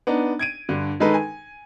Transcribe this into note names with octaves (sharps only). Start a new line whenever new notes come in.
B3 D4 D#4
G#6 D7 D#7
G2 D3
D#3 G#3 D#4 A4 B4
G#5